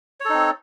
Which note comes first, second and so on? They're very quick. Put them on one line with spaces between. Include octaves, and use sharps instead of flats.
C#5 A4 D#4 C4